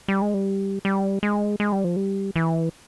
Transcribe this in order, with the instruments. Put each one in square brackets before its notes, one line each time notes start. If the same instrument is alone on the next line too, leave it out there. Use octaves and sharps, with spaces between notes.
[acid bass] G3
G#3
G3
G3
G#3
G#3
G3
F3
G3
E3